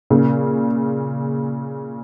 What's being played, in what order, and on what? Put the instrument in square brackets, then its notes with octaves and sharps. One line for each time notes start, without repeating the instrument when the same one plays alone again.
[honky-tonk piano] A#2 C#3